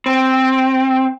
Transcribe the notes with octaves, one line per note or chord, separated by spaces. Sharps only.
C4